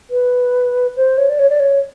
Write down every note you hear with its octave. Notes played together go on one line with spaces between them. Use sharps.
B4
C5
C#5
D5
C#5
D5
C#5